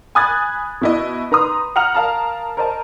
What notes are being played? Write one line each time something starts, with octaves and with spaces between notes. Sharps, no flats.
G#5 B5 D#6 F#6 G#6 A6
B2 E4 D#5
D#4 B4 A#5 C6 D#6
F#5 A#5 F6 F7
A#4 F5 A5 A#5
A#4 C5 D#5 A5